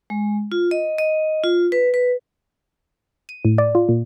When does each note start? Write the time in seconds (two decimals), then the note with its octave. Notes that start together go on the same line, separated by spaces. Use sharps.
0.10 G#3
0.52 F4
0.71 D#5
0.98 D#5
1.44 F4
1.72 B4
1.94 B4
3.29 D#7
3.45 A2
3.58 D5
3.75 F4
3.89 A#2